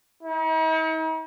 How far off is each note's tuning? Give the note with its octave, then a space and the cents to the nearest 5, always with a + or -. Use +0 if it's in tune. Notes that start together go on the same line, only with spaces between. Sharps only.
D#4 +45